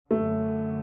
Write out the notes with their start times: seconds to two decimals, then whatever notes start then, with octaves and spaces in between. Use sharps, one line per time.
0.11 F#2 D3 F#3 A3